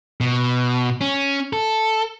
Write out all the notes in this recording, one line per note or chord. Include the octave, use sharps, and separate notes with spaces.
B2
C#4
A4